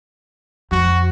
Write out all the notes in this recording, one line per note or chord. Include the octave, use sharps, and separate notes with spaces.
F2 F#4